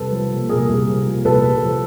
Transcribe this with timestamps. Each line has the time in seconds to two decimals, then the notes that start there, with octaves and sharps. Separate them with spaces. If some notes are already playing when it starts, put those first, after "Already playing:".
Already playing: C2 A4 B4
0.12 F3
0.32 A#2
0.49 C2 G#4 A#4
0.69 C2
0.88 F3
1.06 A#2
1.25 C2 A4 B4
1.43 C2
1.63 F3